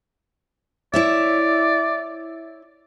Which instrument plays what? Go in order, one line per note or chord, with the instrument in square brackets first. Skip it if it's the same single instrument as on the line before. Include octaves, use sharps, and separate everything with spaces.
[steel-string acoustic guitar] E4 C#5 E5 [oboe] D5